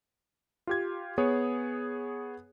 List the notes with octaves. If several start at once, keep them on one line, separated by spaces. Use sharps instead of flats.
F4 G4 G#6
B3 G#4 C#5